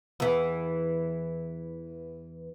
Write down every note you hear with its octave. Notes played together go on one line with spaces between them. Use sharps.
E2 E3